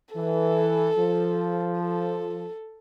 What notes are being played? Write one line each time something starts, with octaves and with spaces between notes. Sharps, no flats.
E3 A4
F3
A4